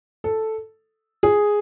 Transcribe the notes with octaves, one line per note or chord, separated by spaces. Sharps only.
A4
G#4